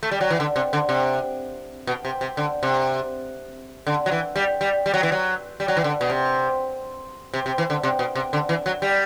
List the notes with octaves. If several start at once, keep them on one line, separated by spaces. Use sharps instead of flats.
A3
G3
F#3
E3
D3
C3
D3
C3
B2
C3
C3
D3
C3
D3
F#3
E3
G3
G3
G3
F#3
E3
F#3
G3
F#3
E3
D3
B2
C3
C3
C3
E3
D3
C3
B2
C3
D3
E3
F#3
G3